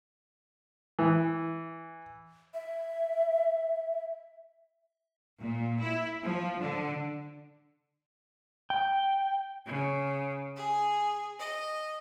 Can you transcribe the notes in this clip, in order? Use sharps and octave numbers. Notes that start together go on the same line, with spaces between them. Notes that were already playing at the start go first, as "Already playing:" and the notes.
E3
E5
A#2
E4
F3
D3
G5
C#3
G#4
D#5